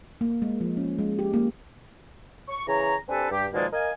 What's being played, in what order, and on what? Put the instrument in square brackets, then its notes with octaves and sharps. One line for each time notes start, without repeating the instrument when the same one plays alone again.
[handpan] A#3
G#3
F3
C#4
G#3
G4
A#3
[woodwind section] C#6
C#3 E3 G#4 C#5 A#5
C4 D4 G4 A4 B4 G#5
G2 G4
B2 D#3 F3 G#3 A#3 D5
A#4 D#5 F5 G#5